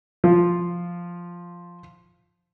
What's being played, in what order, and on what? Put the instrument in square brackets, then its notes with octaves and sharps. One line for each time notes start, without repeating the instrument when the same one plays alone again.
[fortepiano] F3 F4